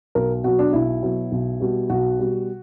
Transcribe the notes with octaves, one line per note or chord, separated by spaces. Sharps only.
B1 A#4
B2 F#3 F#4
D4
B1 E4
B2 F#3
B1
B2 G3
B1 F#4
B2 G3